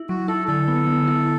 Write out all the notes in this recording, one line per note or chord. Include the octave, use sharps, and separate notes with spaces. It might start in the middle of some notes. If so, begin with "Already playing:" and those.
Already playing: E4
F#3 F#4
E4 A4
D3 A4
B3
D3
E4